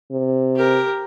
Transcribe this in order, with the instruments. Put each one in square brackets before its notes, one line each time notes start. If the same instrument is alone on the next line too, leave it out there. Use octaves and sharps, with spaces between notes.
[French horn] C3
[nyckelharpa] G4 A#4